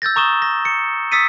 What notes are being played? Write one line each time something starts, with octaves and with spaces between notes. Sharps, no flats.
E6 G6 A6 A#6
A#5 C#6 D#6 E7 G7
A#6
C#7
D#6 E6 A6 B6 C#7 D#7